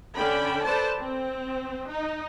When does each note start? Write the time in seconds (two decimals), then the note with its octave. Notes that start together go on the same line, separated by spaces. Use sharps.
0.16 D3 C#4 D4 G5 B5
0.64 A4 B4 C5 D5 A5
0.99 C4
1.88 D#4